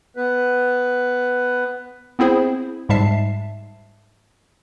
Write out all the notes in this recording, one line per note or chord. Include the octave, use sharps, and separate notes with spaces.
B3 B4
B3 C4 E4 G#4 C5
G#2 G3 G#3 E5 A5 C7